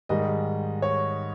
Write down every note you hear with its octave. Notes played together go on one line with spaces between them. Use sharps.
G#2 D#3 G3 D#5
C#5